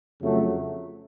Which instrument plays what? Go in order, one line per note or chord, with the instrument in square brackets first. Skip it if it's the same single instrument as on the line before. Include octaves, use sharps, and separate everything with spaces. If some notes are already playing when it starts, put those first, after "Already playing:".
[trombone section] F2 C#3 F#3 A3